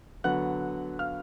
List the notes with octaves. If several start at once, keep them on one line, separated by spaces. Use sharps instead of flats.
D3 F#3 B3 F#5 F#6
F5 F6